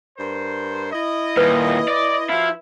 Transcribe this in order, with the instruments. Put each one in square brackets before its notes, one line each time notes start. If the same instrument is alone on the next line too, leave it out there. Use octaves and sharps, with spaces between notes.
[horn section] G2 A#4 C5
E4 D#5
[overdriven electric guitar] D#2 A#2 [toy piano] B4
[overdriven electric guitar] D5
[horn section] F3 F#4 F5 [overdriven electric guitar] E4